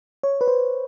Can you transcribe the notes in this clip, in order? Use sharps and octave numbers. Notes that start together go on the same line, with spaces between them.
C#5
B4
C5